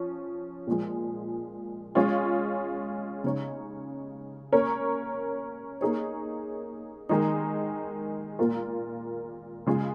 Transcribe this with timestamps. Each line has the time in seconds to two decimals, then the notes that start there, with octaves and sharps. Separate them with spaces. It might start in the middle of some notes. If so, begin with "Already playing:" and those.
Already playing: F3 C#4
0.67 A#2 F3 G#3
1.95 G#3 C#4 F4
3.24 C#3 G#3 D#4 C#5
4.52 A#3 C#4 A#4 C#5
5.81 A#3 D#4 G#4 C#5
7.09 D#3 G#3 D#4
8.39 A#2 A#3 F4 A#4
9.66 C#3 G#3 F4